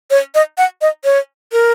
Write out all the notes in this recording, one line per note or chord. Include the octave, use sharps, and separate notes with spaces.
C#5
D#5
F#5
D#5
C#5
A#4